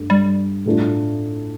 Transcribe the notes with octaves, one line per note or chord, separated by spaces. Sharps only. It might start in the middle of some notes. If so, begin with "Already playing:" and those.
Already playing: G2 A3
G3
A2 A3 D4 F4